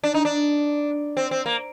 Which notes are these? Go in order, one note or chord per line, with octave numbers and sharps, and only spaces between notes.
D4
D#4
D4
C4
C4
A#3